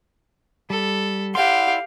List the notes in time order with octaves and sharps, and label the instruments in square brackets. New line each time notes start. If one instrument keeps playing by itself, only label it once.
[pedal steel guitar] G3 [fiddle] A4
[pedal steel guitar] E4 D5 C6 [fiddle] G4 F5 [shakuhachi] F#5